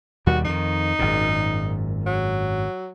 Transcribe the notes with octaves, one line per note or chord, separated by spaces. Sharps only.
D#2 B2 G3 F#4
F2 D#3 D#4
G#1 F#2 A#2
F#3